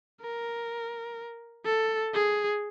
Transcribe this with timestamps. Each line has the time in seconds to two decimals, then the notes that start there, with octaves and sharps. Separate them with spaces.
0.21 A#4
1.66 A4
2.14 G#4